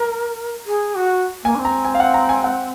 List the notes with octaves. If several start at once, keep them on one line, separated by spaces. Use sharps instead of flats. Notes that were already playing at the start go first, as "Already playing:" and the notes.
Already playing: A#4 A#5
G#4
F#4
A#3 G#5
D4
C4
A#5
G#5
F5
F#5
A#5
G#5
F#5